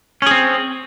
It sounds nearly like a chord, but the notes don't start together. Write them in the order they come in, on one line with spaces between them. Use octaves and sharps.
C#4 G#4 C4